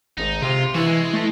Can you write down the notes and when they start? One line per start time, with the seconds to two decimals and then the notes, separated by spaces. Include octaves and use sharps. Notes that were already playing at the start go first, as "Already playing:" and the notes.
0.18 G#1 D#4
0.42 C3 F4
0.75 E3 D4 E4 F#4
0.87 G#3
1.14 A3